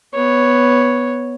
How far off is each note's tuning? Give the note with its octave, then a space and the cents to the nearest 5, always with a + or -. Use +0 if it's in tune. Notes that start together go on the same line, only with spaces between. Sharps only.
B3 +0 C#5 +0